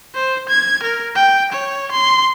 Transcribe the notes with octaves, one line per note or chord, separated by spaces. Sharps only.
C5
G#6
A#4
G5
C#5
C6